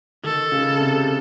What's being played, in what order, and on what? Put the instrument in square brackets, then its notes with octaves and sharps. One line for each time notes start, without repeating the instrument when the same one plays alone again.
[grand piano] D#3 [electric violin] A4
[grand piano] C#3
C3